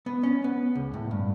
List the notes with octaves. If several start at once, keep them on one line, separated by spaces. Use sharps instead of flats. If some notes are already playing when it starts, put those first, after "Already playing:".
B3
C#4
B3
C#2
A2
G2